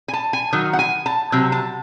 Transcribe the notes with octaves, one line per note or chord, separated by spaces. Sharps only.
G#5
A5
G#5
D#3 F#3
F#5
G#5
A5
C3 F#3
A5